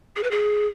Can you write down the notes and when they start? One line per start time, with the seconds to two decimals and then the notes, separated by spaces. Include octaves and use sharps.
0.16 G#4
0.23 B4
0.31 G#4